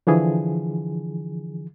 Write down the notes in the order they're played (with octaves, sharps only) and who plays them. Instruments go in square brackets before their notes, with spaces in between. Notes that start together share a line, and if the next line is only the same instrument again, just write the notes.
[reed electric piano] D3 E3 F3 G#4